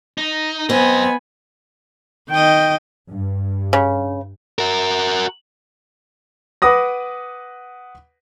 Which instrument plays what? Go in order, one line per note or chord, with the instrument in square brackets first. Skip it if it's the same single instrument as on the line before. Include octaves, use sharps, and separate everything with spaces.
[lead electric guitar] D#4
[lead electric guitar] F#2 D#5 [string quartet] B3 G#5 B5 [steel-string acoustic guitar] C4
[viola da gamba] D#3 D#5 [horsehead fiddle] G5
[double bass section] G2
[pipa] C#3
[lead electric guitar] F#4 A#4
[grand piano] B4 F#5 D6 D#6 A#6